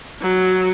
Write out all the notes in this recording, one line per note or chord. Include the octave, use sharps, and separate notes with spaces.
F#3